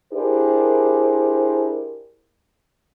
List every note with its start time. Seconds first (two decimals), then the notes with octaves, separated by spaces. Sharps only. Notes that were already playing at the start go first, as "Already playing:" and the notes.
0.13 D4 E4 G4 G#4 A#4 C5